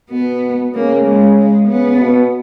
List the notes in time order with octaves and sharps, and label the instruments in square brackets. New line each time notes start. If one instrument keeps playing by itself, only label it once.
[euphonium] B2 [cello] B3
[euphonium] C#3 [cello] A#3
[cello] G#3
G#3
[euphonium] C#3 [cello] B3
[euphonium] B2